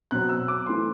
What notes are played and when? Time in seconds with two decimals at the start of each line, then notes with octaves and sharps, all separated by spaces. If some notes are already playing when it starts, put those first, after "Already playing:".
0.11 B2 F#3 C4 F#6
0.29 E6
0.48 D6
0.66 E3 A3 C4 C6